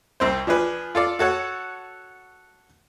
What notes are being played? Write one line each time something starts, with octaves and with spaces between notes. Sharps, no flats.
C2 C4 C5
F3 D4 G#4 B4
F4 A4 D5
F#4 A4 C#5 F#5